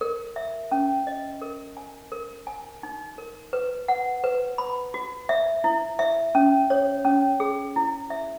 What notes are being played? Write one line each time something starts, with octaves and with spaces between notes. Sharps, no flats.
A#4
E5
C#4
D#5
A#4
G#5
A#4
G#5
D#4
A#4
B4
F#5
B4
B5
F#4
E5
E4
E5
C#4
C#5
C#4
G#4
E4
E5